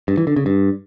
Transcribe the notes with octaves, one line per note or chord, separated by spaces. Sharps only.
G2
E3
D3
C#3
G2